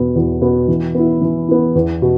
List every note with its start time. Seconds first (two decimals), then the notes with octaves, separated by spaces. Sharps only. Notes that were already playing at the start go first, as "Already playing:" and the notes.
Already playing: E2 B2 B3
0.16 E2
0.41 B2 B3
0.68 E3
0.94 B3 E4
1.22 E3
1.48 B3 E4
1.75 E2
2.02 B2